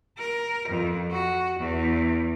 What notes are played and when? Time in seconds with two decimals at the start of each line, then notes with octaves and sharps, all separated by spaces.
0.17 A#4
0.70 F2
1.11 F#4
1.60 E2